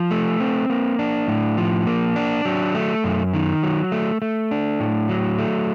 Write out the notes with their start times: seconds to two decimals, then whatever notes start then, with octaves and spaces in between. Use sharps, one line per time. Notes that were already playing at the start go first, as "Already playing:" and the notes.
Already playing: F3
0.11 A3
0.40 C4
0.70 A#3
0.99 D4
1.28 A2
1.58 F3
1.87 A#3
2.16 D4
2.45 F#3
2.75 A3
3.04 F#2
3.34 D#3
3.63 F#3
3.92 A3
4.22 A3
4.51 D4
4.80 A2
5.09 F#3
5.39 A3